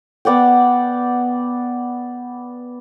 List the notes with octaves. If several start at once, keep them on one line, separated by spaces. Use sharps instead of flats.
B3 D5 F#5 G5